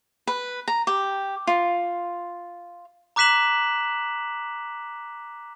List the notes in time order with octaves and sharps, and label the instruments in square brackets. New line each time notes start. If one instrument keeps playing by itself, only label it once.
[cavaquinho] B4
A#5
G4
F4
[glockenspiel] A#5 D6 F#6 B6 E7 F#7